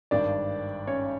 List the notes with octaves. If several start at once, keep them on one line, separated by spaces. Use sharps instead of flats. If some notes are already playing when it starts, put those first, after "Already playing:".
G#1 G2 D#3 D4 D5
C#4 C#5